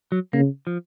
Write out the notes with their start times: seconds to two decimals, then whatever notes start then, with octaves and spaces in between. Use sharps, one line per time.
0.12 F#3
0.33 C#3 A#3
0.67 F3